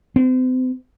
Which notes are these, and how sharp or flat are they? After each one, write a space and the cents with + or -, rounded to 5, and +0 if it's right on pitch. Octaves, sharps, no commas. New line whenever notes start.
C4 -40